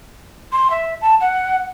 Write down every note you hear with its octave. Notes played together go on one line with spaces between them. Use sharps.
C6
E5
A5
F#5